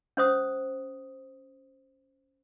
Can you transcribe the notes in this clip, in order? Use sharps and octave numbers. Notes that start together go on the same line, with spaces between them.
C#4 C5 D#6